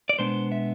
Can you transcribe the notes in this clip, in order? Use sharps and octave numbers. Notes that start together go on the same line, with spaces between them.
D5
B2 G#3 B3 D4 C5
E5